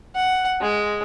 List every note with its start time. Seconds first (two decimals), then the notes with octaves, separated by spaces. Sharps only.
0.15 F#5
0.61 G#3